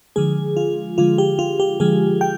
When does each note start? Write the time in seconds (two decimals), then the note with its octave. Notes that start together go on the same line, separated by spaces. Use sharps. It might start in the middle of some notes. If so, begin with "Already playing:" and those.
0.16 D3 F3 G#3 G#4
0.57 F4
0.98 D3 F3 G#3 F4
1.18 G4
1.39 F4
1.60 G4
1.80 D3 F3 G#3 G#4
2.21 G5